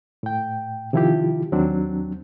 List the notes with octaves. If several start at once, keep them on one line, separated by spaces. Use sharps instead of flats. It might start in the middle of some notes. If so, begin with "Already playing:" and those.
A2 G5
C3 D#3 F3 E4 F4 G4
D#2 F#3 C4 D4